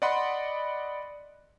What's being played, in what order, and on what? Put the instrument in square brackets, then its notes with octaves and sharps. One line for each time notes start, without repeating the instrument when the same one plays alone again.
[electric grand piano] D5 D#5 F#5 B5 C6